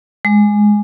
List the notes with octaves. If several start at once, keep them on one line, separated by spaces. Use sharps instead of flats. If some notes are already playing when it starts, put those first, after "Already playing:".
G#3